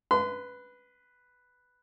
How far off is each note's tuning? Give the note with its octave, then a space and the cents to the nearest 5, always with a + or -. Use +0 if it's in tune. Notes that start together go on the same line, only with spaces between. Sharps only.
B4 +0 C6 -35